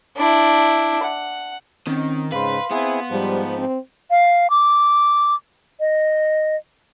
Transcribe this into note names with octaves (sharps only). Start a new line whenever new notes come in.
D4 E4
F#5
D#3 C4 C#4
G#2 C#3 B4 F5 C6
B3 C4 E4 G#4
G#2 F3 G3
C4
F5
D6
D#5